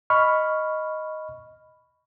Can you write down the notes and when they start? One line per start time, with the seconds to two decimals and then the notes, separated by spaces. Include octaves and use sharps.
0.10 D#5 B5 C#6 F6